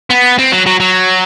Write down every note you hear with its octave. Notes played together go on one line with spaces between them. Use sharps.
B3
C4
F#3
F#3
F#3